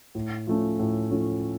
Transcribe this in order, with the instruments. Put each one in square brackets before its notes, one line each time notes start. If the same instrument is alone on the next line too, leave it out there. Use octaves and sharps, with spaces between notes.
[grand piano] A2
F3 A3 C#4
A2
F3 A3 C#4